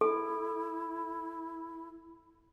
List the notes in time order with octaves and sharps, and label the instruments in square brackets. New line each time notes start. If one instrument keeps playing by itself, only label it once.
[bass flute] E4 [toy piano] A4